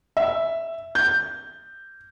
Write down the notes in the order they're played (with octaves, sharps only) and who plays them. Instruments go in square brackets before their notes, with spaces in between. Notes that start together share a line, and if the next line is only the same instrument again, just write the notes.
[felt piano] E5
G6